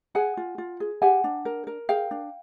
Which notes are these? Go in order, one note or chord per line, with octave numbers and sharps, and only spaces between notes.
G#4 F#5 G#5
F4
F4
G#4
G4 F#5 G#5
D4
A#4
A#4
G#4 F5 G5
D4